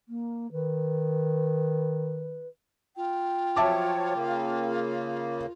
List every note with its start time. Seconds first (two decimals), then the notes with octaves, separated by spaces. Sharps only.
0.09 A#3
0.52 D#3 B4
2.97 F4 G5
3.56 F3 F#3 C#5 E5 A5 D6
4.15 C#3 A#3